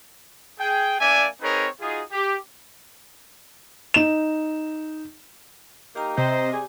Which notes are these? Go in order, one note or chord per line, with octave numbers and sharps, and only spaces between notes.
G#4 G5
A#3 D4 D5 E5 G#5
C4 D#4 G#4 A#4 B4 C#5
D#4 F4 F#4 G#4
G4
D#4 E7
A#3 D#4 G4 G5 A#5
C3 C5 D#5
G3 C4 G4 G#4 G#5